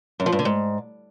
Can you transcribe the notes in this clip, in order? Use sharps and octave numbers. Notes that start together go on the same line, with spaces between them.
F#2
F3
G2
D3
G#2